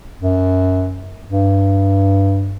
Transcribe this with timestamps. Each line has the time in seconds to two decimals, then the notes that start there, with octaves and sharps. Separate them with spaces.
0.22 F#2
1.30 G2